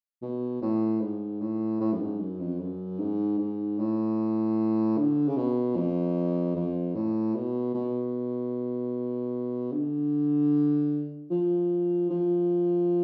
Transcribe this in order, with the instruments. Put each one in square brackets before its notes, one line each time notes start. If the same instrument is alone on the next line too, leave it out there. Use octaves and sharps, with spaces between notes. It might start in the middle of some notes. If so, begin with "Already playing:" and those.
[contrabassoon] B2
A2
G#2
A2
A2
F#2
G#2
F#2
F2
F#2
G#2
G#2
A2
D3
C#3
B2
F2
F2
A2
B2
B2
D3
F3
F3